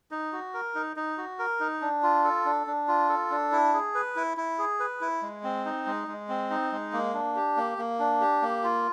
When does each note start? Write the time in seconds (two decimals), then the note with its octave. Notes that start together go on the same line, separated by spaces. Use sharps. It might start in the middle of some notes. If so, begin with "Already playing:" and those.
0.11 D#4
0.33 F#4
0.54 A#4
0.75 D#4
0.97 D#4
1.18 F#4
1.39 A#4
1.60 D#4
1.81 D4
2.03 F4
2.24 A4
2.45 D4
2.67 D4
2.88 F4
3.09 A4
3.31 D4
3.52 E4
3.74 G#4
3.95 B4
4.16 E4
4.37 E4
4.58 G#4
4.80 B4
5.01 E4
5.23 G#3
5.43 C4
5.65 D#4
5.86 G#3
6.08 G#3
6.29 C4
6.50 D#4
6.72 G#3
6.93 A#3
7.14 D4
7.36 G4
7.57 A#3
7.78 A#3
7.99 D4
8.21 G4
8.42 A#3
8.63 F4